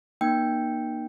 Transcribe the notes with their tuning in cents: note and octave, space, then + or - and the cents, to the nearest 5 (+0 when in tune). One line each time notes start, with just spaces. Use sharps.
A#3 +30 D#4 -30 G5 +0